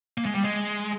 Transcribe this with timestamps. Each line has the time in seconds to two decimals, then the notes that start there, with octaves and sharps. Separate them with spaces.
0.18 A#3
0.26 G#3
0.35 G3
0.44 G#3